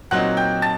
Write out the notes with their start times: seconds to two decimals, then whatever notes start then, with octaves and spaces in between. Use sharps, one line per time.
0.11 A#2 F#3 C4 D#4 F#5 F#6
0.37 G5 G6
0.62 A5 A6